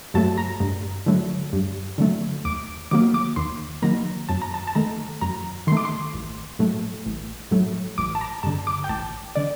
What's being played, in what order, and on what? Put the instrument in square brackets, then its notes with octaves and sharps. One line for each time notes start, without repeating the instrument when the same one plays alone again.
[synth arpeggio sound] G2 F#3 A3 A5
A#5
G2
D3 F#3 A3
G2
D3 F#3 A3
D#2 D6
D#3 F#3 A#3 D6
D6
D#2 C6
D#3 F#3 A#3 A#5
F#2 A5
A#5
A5
A5
D#3 A3 A#5
F#2 A#5
D#3 A3 C6
D6
C6
A1
A2 F#3 A3
A1
A2 F#3 A3
A1 D6
A5
A#5
G2 D3 A5
D6
G5
A1 A5
D3 D5